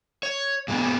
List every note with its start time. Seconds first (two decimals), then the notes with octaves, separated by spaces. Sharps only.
0.23 C#5
0.68 A#2 G#3 B3